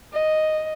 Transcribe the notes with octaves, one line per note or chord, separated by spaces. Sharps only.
D#5